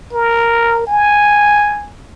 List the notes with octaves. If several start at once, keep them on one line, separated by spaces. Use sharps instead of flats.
A#4
G#5